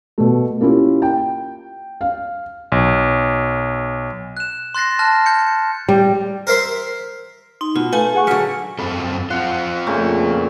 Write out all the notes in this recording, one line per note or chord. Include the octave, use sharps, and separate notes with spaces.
B2 A3
A#3 C#4 E4 F4 G4
G5
F5
B1
F#6 E7
C6 F#6 A6 A#6 C7
A5 F6 F#6 A#6
G6 C#7
G3
A#4 C5 E5 C6
D#4 C6
B2 F4
A3 B4 F5 G#5
G#4 F#5 C#6
D3 F#3 F6 B6 C#7
F#2 C4 A4 B5
C4 F4 F#5
A#2 C#3 A3